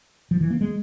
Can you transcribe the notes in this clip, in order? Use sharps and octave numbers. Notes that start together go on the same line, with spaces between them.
F3
E3
A#3
G#3